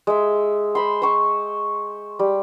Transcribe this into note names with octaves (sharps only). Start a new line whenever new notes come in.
G#3 E5
C5 B5 C6
C5 C#6 E6
G3